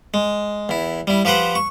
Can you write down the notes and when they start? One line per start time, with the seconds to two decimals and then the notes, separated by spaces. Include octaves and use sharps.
0.14 G#3
0.69 E2 E4
1.07 G3 E4
1.25 F3 G4 B4 C5 F#5
1.55 C#6